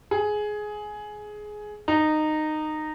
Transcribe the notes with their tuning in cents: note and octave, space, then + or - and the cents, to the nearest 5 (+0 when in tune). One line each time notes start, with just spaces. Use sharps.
G#4 +15
D#4 -15